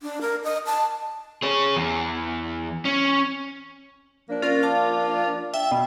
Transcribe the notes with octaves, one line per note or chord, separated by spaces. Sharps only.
D4
A#4
D#5
A5
G#4 C#5
E2
C#4
F3 A#3 D4
C#4 F4 A#4 D5
F5 A5 D6
E5 G5
B2